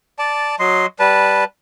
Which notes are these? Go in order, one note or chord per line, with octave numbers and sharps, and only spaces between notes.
D5 A5
F#3 D#5 C6
G3 B4 A5